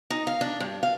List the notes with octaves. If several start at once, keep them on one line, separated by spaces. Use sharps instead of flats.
D#4
F5
D4
G2
F5